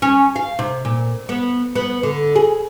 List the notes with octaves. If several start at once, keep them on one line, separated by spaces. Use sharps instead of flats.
C#4
F5
C3
A#2
B3
B3
D3
G#4